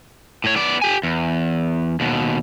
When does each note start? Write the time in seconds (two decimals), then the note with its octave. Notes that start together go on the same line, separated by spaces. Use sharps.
0.44 A2 C#5
0.56 B3 D5
0.82 G4 G#5
1.03 E2
2.00 D#2 B2